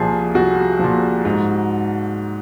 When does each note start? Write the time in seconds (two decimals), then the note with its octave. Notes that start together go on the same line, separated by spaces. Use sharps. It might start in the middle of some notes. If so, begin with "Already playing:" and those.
Already playing: C2 A#2 F3 G#4
0.34 C2 F#4
0.79 A#2 F3
1.25 G#2